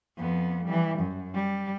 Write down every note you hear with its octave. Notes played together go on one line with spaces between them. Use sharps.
F2 B3
E3 G3
F#2
G3